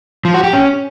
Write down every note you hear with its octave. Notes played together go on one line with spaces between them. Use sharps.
F3
F#4
G4
C#4